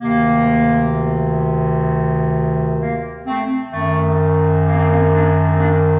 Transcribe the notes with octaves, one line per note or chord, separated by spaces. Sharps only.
D2 C3 D#3 A#3
A#3
A3 C4
F#2 D#3 A3
A#3
C4
A#3
A#3 D4
C4
A#3 D4